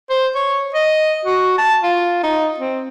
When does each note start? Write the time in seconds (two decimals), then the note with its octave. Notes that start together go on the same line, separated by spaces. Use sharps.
0.10 C5
0.35 C#5
0.74 D#5
1.25 F#4
1.58 A5
1.83 F4
2.23 D#4
2.60 C4